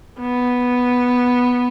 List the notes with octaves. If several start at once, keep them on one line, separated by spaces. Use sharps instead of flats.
B3